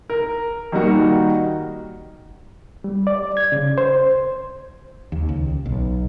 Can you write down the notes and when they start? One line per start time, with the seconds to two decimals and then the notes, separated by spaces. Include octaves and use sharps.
0.10 A#4
0.72 D#3 G3 A#3 D#4 F#4 A#4
2.84 G3
3.07 D5
3.37 G#6
3.52 C#3
3.78 C5
5.12 D#2
5.29 C#2
5.66 B1